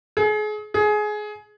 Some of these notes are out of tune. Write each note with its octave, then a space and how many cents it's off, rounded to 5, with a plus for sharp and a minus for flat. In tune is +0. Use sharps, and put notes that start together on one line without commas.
G#4 +35
G#4 +20